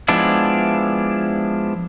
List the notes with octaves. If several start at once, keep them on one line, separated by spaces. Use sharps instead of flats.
F3 G#3 B3 D4 E4